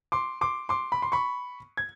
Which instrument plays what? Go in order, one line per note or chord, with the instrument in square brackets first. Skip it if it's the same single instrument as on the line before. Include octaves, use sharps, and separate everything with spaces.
[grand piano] C6 D6
C6 D6
C6 D6
B5
C6
B5 C#6
G#6